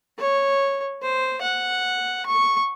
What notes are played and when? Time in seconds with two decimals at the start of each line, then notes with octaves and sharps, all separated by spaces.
0.19 C#5
1.02 C5
1.41 F#5
2.26 C#6